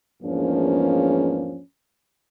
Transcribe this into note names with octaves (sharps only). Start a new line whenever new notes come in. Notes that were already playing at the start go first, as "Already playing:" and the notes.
E2 G#2 F3 A#3 C#4 D4